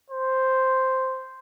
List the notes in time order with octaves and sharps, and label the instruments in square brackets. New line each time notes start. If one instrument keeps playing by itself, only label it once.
[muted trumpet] C5